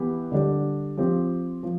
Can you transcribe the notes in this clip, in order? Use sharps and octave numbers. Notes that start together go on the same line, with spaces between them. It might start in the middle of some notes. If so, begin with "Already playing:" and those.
Already playing: E3 B3 E4 G4
D3 G3 D4 G4
F3 C4 G4
F3